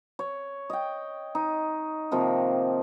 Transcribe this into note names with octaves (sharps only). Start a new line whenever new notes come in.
C#5
D#5 G5
D#4
C3 D#3 F3 A#3